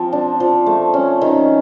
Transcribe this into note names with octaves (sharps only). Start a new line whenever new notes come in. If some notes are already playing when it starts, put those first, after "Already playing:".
Already playing: F3 C4
D4
F3
A3
C#4
D#3